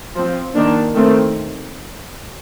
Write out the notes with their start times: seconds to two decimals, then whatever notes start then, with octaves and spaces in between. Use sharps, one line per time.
0.15 F3 C4
0.55 D#3 A#3 D4
0.95 D#3 A3 C4